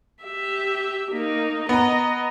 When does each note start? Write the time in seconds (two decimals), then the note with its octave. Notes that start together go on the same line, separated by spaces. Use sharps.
0.24 G4 E5
1.11 A#3 D#4
1.69 B3 D#5 A#5